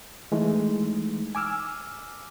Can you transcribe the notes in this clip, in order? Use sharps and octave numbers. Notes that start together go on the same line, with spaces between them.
E3 G#3 A3 D#4
G#5 D6 E6 F6